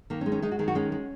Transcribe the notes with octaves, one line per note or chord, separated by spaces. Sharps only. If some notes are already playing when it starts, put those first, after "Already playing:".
D#3 A#3
C#4
G#3
C#4
G#3 D#4
F#4
D#3 G#4
F#4
G#3 C#4
G#3